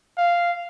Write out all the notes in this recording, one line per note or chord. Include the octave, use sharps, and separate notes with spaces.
F5